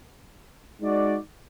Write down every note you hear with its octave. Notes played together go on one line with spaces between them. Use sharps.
G#3 D#4 F#4 D5